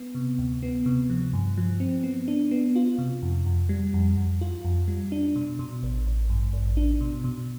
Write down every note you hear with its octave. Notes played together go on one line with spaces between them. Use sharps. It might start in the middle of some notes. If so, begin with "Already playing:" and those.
Already playing: B3
C3
D2
B3
C3
F3
G2
F3
C4
B3
D4
B3
F4
C3
F2
F2
G3
F2
F2
F4
F2
G3
D4
B2
B2
A1
A1
G2
A1
D4
B2
B2